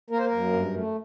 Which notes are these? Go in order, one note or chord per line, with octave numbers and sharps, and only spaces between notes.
A#3 A#4
C5
A#4
F#2
G2
A3